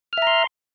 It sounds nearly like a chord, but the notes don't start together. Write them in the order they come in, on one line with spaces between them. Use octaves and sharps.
F6 E5 A#5 C6